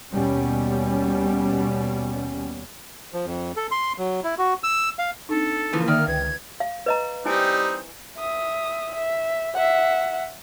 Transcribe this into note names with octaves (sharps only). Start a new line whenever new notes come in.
D#2 B2 G3 C#4
F3
F2
A4
C6
F#3
E4
F#4
E6
F5
C4 D4 D#4 A4
C#3 E3 F3 A#3
D3 D#3 D5 E5 F6
C#2 B4 G5 G#6
F5
B4 D#5 A#5
G3 C4 D#4 E4 G#5
E5 D#6
E5
E5 F#5